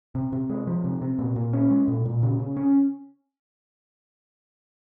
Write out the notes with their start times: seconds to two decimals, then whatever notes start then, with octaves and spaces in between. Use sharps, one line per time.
0.15 C3
0.32 C3
0.50 G#3
0.67 F3
0.84 C3
1.02 C3
1.19 A#2
1.36 A#2
1.53 C#4
1.71 G#3
1.88 A#2
2.05 A#2
2.23 C#3
2.40 C#3
2.57 C#4